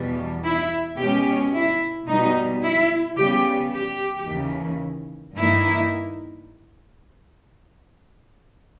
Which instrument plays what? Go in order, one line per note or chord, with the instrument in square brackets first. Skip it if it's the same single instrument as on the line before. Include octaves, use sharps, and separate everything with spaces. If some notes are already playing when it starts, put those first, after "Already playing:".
Already playing: [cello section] E2 B2 G3
E4
B2 G#3 C#4 G4
E4
B2 G3 B3 D#4
E4
C#3 G3 B3 G4
G4
D#2 C#3 E3
G2 D#3 A#3 D#4 E4